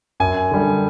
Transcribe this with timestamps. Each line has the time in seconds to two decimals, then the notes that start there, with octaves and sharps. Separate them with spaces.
0.20 F#2 G#5
0.51 D3 G3